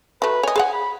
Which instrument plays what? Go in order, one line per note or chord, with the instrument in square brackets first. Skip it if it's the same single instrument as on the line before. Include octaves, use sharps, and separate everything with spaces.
[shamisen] F#3 A3 [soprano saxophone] B4
[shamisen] C#5 D#5 [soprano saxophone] G#5
[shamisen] G#4 C#5 F#5
[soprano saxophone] B5